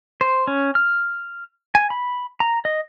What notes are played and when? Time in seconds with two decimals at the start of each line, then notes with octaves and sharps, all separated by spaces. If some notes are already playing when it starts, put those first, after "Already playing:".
0.21 C5
0.47 C#4
0.75 F6
1.75 G#5
1.90 B5
2.40 A#5
2.65 D#5